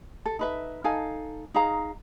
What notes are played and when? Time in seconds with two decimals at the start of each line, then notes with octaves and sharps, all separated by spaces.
0.26 A4
0.39 D#4 B4 E5
0.84 D#4 A4 F5 G#5
1.54 D#4 G#4 F5 A#5